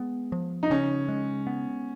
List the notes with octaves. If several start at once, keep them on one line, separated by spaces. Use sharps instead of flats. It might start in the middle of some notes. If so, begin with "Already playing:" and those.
Already playing: G#3 B3
F3
D#4
C#3 C#4
G#3
B3